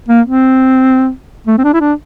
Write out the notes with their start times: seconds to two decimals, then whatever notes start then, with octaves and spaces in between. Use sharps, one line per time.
0.09 A#3
0.26 C4
1.47 A3
1.58 C4
1.64 D4
1.74 E4
1.81 D4